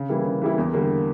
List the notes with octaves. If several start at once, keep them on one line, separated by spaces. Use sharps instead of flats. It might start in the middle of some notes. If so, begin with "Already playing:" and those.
Already playing: C#3
E3 G3 A#3 E4
C#3
E3 G3 A#3 E4
E2
D3 G3 A#3